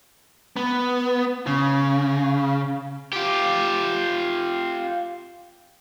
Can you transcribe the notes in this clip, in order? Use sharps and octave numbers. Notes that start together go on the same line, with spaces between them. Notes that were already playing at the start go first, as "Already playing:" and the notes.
B3
C#3
F4 G4